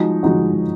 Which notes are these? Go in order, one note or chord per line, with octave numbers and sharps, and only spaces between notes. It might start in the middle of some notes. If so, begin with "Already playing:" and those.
Already playing: F3 G#3 D#4 F#4
F3 G#3 D#4 F#4